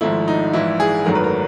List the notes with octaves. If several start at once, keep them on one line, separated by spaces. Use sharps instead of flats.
G#1 G#2 F3 A3 E4
D#4
A#1 G#2 E3 E4
G#4
G#1 F#2 D#3 F#3 A3 A#4
B4
A#4